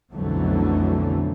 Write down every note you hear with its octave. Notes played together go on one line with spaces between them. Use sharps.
B1 F2 D3 E3 F#3 A3